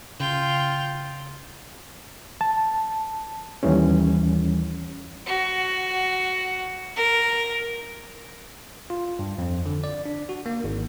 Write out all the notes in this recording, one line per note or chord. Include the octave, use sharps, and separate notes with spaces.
C#3 F4 G5
A5
D#2 E3 G3 C#4
F#4
A#4
F4
G2
F2
D3
D5
D4
F#4
A#3
G#1